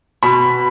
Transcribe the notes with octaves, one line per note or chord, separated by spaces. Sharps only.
B2 B5